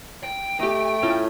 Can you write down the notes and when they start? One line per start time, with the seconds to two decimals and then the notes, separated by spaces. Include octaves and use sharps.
0.23 G5
0.60 A3 D#4 G4
1.03 A2 C#4 F4